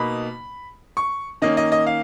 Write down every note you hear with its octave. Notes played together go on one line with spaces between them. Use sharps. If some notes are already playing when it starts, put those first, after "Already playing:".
Already playing: B2 A#3 D#4 B5
C#6
D#3 A#3 C#4 D#5
D#5
D#5
F5